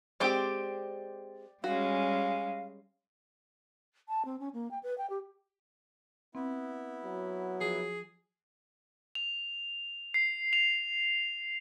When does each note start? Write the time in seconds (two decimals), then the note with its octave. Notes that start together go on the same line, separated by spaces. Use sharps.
0.20 G#3 C4 G4 D5 G5 D6
1.64 G3 G#3 C#4 F#4 F5
4.08 A5
4.25 C4
4.40 C#4
4.54 A#3
4.71 G5
4.83 B4
4.98 G5
5.10 G4
6.35 B3 C4 E4
7.05 F#3
7.61 F3 F4 G#4
9.15 F7
10.14 C7
10.53 F7